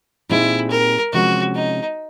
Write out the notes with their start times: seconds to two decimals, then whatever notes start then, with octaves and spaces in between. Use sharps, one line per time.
0.30 A#2 G3 C4 D#4 E4 G#4
0.71 A#4
1.12 C3 F3 G#3 C#4 F#4
1.55 D#4